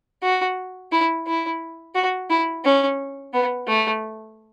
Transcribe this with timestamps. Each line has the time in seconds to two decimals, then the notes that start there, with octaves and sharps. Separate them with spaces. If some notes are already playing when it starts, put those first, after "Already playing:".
0.23 F#4
0.92 E4
1.27 E4
1.95 F#4
2.30 E4
2.64 C#4
3.33 B3
3.68 A3